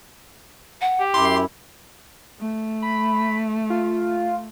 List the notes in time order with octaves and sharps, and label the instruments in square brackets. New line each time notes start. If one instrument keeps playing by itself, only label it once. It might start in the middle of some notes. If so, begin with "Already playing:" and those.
[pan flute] F#5
[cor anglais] G4
[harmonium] F#2 E4 [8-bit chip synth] C6 [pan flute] D6
[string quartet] A3
[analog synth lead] B5
F4